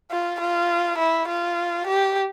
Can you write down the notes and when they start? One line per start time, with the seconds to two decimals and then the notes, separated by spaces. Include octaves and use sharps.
0.11 F4
0.40 F4
0.98 E4
1.28 F4
1.87 G4